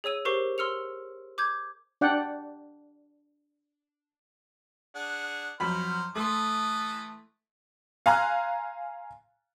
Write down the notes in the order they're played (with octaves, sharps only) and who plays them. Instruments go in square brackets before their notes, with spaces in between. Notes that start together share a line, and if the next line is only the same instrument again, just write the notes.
[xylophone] G#4 C#5 E6 D#7
G4 A#4 C5 C#6 C7
C6 E6 F6 C#7 F7
D6 G6 G#6
[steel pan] D4 D5 F#5 G5
[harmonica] D4 G#4 F#5
[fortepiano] F2 F#3 B5 [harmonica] C5 F6
[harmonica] E3 A4 D#6 [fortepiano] A3 C6
[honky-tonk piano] F5 G#5 A#5 C6 F6 F#6